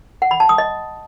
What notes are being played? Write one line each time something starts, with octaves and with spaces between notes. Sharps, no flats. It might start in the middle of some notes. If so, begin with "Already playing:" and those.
F#5
B5
A5
D#6
D#5